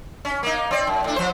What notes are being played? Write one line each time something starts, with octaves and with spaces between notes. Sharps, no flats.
C#4
A#3 D#4
C4 D5
F#2
A2 D4
F3 C5